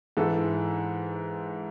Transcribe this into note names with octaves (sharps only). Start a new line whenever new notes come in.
G#2 E3 G#3 A4